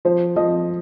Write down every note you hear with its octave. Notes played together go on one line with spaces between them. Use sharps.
F3 C5
F3 D#5